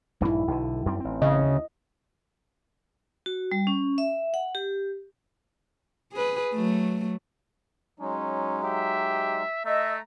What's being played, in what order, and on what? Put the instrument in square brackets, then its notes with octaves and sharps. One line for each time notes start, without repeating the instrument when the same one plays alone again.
[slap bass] A#1 G2 E3 [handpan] D#4 E4
[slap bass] B1 D3
F#2 G3 C4
A1 C4
[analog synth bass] C#3 [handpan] D#5
[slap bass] D2
[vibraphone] F#4
G3
C#4
E5
F#5
G4
[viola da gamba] G#4 B4
F#3 A3
[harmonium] F#3 G#3 D#4 [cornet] C#4
[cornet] G4 [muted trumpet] E5
[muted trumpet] A3 [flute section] D#5 E6 [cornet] E5 [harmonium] A#5